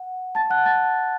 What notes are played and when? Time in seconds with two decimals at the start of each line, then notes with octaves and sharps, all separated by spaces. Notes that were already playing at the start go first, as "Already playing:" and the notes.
Already playing: F#5
0.35 A5 A6
0.50 F#5 F#6
0.65 A5 A6